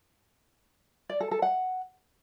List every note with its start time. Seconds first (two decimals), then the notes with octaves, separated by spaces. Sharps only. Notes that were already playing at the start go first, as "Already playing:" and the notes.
1.09 D5
1.20 A4
1.31 A4
1.42 F#5